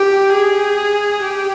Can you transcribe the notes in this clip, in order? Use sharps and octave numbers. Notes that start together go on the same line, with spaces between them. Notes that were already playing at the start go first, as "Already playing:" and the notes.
Already playing: G4
G#4
G4